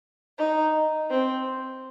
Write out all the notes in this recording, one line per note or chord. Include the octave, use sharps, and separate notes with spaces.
D#4
C4